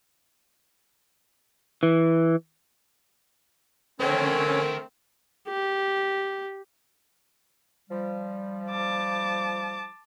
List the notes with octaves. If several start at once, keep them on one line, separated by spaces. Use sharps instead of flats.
E3
D3 A3 C4 C#4 A#4 C#5 G5
G4
F3 G3
A5 D6